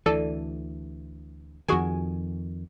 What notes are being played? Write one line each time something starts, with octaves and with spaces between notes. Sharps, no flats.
D2 E3 A4 D5
F2 D#3 F#4 G#4 G#5